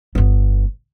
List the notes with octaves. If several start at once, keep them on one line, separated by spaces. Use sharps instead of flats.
G1 B3